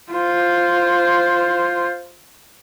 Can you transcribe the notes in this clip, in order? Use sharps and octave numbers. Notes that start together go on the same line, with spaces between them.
F4 C5